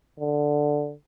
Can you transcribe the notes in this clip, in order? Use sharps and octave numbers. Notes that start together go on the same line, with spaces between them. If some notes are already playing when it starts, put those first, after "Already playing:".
D3